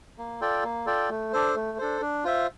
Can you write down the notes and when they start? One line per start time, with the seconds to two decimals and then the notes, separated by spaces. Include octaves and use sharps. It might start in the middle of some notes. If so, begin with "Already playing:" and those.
0.18 A#3
0.41 F4 A4 D5 G5
0.63 A#3
0.86 F4 A4 D5 G5
1.10 A3
1.33 D4 A4 C5
1.55 A3
1.78 D4 A4 C5
2.01 D4
2.24 F4 C5 E5